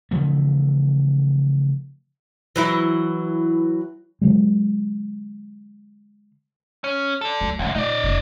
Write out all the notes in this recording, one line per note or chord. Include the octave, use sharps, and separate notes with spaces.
C#3 E3 F3 A3
E3 F#3 E4
D3 F#3 G#3
C#4
A4 D5
D2 F#3
C2 F#2 D3 C#4
A#2 D#4 D5
F1 C#3